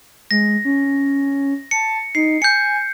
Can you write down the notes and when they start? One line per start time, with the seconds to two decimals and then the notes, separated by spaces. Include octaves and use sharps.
0.31 G#3 A#6
0.65 C#4
1.71 A5 C#7
2.15 D#4 C7
2.42 G#5 G6 C#7